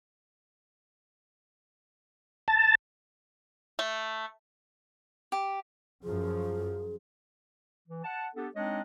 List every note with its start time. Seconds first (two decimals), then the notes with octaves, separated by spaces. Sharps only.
2.48 A5
3.79 A3
5.32 G4
6.04 F#2 F3 G#4
7.89 E3
8.04 F#5 A5
8.35 B3 D4 G4 A4
8.56 G#3 C4 D4 D#4 C#5 D#5